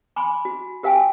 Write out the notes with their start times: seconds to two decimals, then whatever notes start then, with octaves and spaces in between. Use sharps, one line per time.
0.16 G#5 B5 C6 D6
0.45 F#4
0.83 G4 A#4 F5 G5 G#5